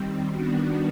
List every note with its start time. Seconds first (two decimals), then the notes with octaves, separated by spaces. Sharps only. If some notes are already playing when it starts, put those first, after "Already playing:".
Already playing: D#3 G3 C4
0.30 D#3 G3 B3 D4 F#4